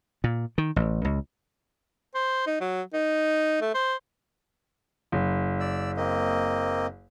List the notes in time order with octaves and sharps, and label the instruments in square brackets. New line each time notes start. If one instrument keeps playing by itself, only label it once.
[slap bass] A#2
D#3
A1
C#2
[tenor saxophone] C5
D#4
F#3
D#4
A3
C5
[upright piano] F#1
[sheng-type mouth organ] D5 E6
A#3 C4 D#5